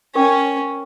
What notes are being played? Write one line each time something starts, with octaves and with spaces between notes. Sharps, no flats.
C#4 A#4 C#5 G5 C#6